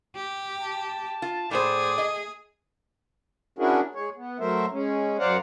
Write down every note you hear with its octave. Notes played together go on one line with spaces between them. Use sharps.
G4
A5
F4
A2 G#4 C5 D5
D#5
C#4 D4 E4 F#4 G#4 A#4
G#3 C#5
B3
F#3 A3 A#4 C5 E5
G#3 C#4
F#2 C5 D5 F5 F#5 A#5